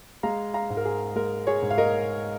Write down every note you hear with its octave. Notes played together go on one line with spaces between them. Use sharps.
G#3 F5 A#5
F5 A#5
G#2
A#4
G#4
G#3 A#4
G#4 C#5
G#2
F5
A#4 D#5